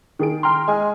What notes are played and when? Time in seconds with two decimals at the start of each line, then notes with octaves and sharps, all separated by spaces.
0.19 D#3 G#4 D7
0.43 G5 A#5 C6 F6
0.68 G#3 G#5